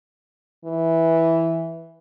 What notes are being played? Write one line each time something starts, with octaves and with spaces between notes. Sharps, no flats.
E3